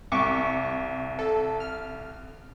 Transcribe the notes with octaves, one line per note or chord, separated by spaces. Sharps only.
C2 C#6 D6
A4
F6